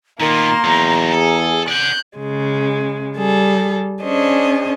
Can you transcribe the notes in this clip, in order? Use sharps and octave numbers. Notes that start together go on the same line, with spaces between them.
A#2 D#3 A#3 B3 A#5 C6
E2 F#3 D#4
G#4 A4
D5 F#5 F#6 G6
C#3 G#3
G3 G#4 A4
C#4 D4 G#4 C5 D#5